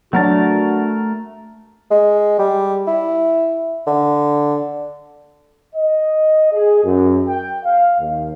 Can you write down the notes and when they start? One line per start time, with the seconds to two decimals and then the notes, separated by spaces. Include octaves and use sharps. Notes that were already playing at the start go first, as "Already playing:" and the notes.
0.13 F#3 A3 D4 F#4 A#4 A5
1.91 G#3
2.39 G3
2.87 E4
3.87 D3
5.75 D#5
6.52 G#4
6.84 F#2
7.28 G5
7.64 F5
7.99 D#2